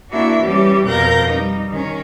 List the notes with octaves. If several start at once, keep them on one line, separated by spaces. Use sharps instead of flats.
A#3 D4 E4 F#4 E5
E3 G3 C#4 G4
F2 B2 A#4 F5 G6 A#6
G3 D#4
D#3 C#4